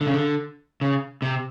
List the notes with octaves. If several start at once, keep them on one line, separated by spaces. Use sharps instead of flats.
D3
C#3
D3
C#3
C3